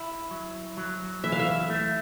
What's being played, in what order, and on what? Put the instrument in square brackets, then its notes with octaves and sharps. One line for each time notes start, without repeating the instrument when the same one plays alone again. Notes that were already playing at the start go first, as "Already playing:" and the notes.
Already playing: [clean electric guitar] E4
F#3
F#3
[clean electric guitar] E3 [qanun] E5
[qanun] F5
E5
[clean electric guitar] A3